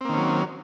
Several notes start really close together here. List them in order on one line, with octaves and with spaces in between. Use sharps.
C4 A#3 D#3 C#4 F#3